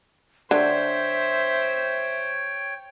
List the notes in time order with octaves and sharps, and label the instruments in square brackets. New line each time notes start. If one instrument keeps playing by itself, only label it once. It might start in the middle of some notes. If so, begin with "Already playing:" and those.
[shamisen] D3 [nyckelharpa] C5 [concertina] C#5 G5 [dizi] E5